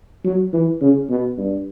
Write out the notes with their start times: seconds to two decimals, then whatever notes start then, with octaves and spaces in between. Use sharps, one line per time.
0.24 F#3
0.53 E3
0.81 C#3
1.09 B2
1.37 G2